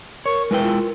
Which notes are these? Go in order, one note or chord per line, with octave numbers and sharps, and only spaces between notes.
A#4 C#5 C#6
G#3 E4 B4 G5
F4